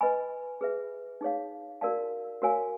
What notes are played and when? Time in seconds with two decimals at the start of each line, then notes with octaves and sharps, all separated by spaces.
0.01 B4 D#5 G#5 B5
0.61 G#4 B4 E5
1.21 D#4 G#4 C#5 F5
1.81 F#4 A#4 D5 F5 A5
2.42 F#4 A#4 C#5 F5 G#5